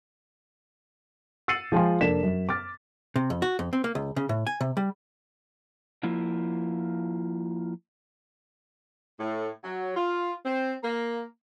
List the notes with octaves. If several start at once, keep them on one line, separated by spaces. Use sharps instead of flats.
E6 A6 C7 C#7 D#7 F#7
F3 G#3 F4 G5 G#5 C6
F1 A#3 D4 A4 B6 E7
F#2
D6 F6 A6
C3
F2
F#4
F2
C4
A#3
C#2
C#3
A2
G#5
C3
G3
F3 A#3 E4 F4
A2
F#3
F4
C4
A#3